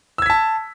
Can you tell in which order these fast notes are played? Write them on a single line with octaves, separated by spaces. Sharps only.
E6 G#6 B6 A5